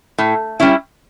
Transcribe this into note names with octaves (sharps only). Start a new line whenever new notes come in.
A2
G3 C#4 E4